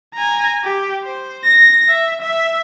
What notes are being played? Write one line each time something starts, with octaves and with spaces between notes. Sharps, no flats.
G#5 A#5
G4
C5
A#6
E5
E5